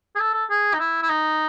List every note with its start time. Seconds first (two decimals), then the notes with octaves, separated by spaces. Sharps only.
0.15 G#4
0.19 A4
0.34 A4
0.50 G#4
0.74 D#4
0.79 E4
1.02 E4
1.09 D#4